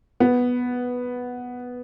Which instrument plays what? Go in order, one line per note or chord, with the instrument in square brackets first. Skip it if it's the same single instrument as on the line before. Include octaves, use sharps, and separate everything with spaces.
[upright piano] B3